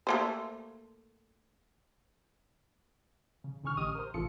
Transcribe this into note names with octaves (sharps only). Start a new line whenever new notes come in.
A3 A#3 C5
C#3
C2 D3 C#4 C#6 F6
A1 G4 D#5 D#6 F6 D#7
A#4 C5
A1 C3 E3 F4 A4 C#7